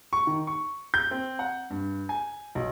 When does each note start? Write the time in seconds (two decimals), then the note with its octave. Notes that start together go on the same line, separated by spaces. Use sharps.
0.13 C#6
0.27 D#3
0.47 C#6
0.94 G6
1.11 C4
1.39 F#5
1.70 G2
2.09 G#5
2.55 B1